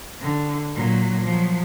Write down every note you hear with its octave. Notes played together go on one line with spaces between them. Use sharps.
D3
A#2 F#3
F3 F#3